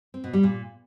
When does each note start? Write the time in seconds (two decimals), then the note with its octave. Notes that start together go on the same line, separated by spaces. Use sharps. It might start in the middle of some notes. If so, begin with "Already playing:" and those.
0.14 C4
0.24 B2
0.33 G3
0.43 A#2